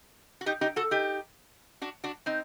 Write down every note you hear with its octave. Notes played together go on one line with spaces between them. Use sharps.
F#4
D#4 G4
D#4 G4
F#4 A4
D#4 G4
D4 F#4
D4 F#4
C4 D#4